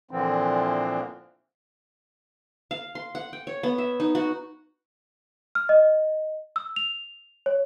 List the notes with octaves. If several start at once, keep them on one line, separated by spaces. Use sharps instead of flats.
A#2 D3 E3 F3 C4
F5
C6
F#5
G5
C#5
B3
E5
D#4
F#4
F6
D#5
E6
F7
C#5